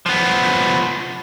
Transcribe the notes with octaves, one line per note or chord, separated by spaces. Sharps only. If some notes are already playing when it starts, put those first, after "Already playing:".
F3 B3